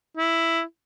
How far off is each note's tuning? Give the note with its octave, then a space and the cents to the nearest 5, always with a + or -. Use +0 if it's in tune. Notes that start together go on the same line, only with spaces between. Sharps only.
E4 +5